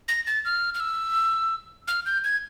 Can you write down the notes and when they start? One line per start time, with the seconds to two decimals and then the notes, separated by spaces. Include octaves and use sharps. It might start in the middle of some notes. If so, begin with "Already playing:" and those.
0.08 A#6
0.27 A6
0.45 F6
0.74 F6
0.80 E6
1.88 F6
2.06 G6
2.24 G#6